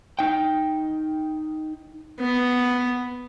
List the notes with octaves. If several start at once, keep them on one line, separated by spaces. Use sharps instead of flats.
D#4 G5
B3